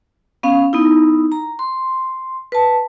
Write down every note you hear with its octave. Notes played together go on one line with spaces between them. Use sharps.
B3 C#4 F5
B3 D#4 E4
A#5
C6
B4 A5